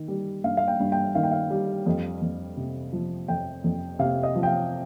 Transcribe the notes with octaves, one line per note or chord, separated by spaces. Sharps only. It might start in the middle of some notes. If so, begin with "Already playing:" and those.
Already playing: D#3
G3
G2 F5
F5
G5
G2
G5
D#3 F5
G5
F5
G3
F2
F2
C3
F3
F2 G5
F2
C3 F5
D#5
F3
G5
F5